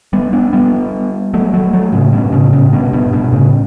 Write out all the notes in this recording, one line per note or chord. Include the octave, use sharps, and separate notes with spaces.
G3 B3
B3 D4
G3 B3
F#3 A3
F#3 A3
F#3 A3
A2 C#3
G2 B2
A2 C#3
A2 C#3
G2 B2
G2 B2
G2 B2
A2 C#3